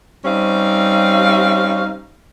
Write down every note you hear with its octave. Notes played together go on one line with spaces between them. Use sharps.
G3 C4 C#4 D#4 F5